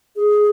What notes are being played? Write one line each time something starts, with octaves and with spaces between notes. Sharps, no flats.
G#4